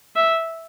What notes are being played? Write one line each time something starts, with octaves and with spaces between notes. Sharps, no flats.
E5